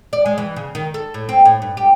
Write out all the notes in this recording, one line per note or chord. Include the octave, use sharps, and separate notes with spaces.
D5
G#3
E3
C#3
D#3
A4
A2
C4
A2
G2
G4